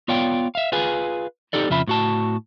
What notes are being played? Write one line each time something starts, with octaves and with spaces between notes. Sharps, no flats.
B3 F4 C#5 D5 F5 G5
E5 F5
F4 G#4 B4 F5 G#5
D#4 G4 A4 D5
F2 C#3 F4 E5 B5
A2 F#4 A5